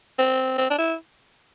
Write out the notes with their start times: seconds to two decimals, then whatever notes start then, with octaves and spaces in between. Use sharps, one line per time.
0.19 C4
0.58 C4
0.70 D4
0.78 E4